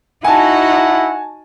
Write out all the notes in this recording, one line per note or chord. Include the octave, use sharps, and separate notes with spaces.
D#4 E4 F#4 F#5 G#5 A5